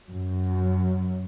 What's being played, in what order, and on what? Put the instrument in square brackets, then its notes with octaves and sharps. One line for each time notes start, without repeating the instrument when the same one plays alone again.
[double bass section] F#2